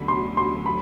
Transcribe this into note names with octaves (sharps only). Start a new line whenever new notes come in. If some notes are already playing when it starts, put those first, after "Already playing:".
Already playing: D2 D3 F#3 B5
C6
C6
B5